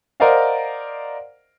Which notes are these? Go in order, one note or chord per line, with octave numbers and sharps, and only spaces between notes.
A#4 C5 D5 D#5 F5 F#5